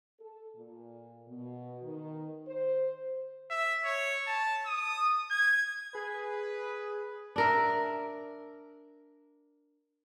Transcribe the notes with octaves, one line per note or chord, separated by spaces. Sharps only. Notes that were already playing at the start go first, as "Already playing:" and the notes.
A4
A#2
B2
D#3
C5
E5
C#5
A5
D#6
G#6
G#4 B4
D4 A#4 E5